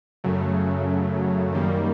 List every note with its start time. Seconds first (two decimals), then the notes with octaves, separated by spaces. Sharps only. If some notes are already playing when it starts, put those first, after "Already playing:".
0.24 F#2 C#3 F#3 A3
1.52 F#2 D#3 G3 A#3